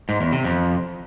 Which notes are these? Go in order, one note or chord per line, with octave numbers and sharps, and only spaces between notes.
G#2
E2
C3
F2